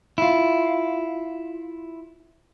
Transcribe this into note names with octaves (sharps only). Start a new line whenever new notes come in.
E4 F4